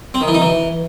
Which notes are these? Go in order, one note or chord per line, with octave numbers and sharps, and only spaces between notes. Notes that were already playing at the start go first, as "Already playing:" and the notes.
C4
D#3
E3
D#4
E3